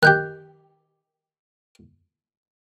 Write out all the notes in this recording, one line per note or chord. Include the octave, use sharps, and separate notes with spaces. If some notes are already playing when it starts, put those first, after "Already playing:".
D#3 G4 F#6 G6